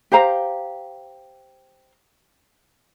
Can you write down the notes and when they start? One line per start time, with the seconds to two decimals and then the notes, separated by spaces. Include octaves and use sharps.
0.12 G4 C5 F5 A#5